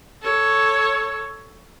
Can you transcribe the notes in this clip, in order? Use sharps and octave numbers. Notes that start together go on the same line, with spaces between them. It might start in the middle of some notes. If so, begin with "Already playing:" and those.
A4 C#5